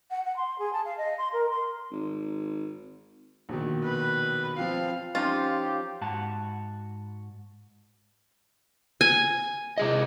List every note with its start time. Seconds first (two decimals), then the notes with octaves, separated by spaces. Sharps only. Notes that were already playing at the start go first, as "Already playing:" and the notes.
0.10 F#5
0.24 F#5
0.36 C6
0.59 G#4
0.73 A5
0.85 F5
0.97 D#5
1.18 C6
1.32 A#4
1.51 C6
1.91 G#1
3.49 A#1 B2 D#3
3.84 B4
4.58 F3 C4 F4 F5
5.15 F3 C#4 D#4 F4 G4
6.01 G#2 F#4 A5
9.01 G#5
9.78 C3 G#4 D#5